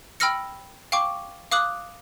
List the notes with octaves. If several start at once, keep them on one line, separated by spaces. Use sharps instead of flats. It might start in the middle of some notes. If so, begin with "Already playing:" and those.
G5 B5 E6 F6 A#6 C#7
F5 G5 C#6 D6
F5 D6 D#6 F#6 F#7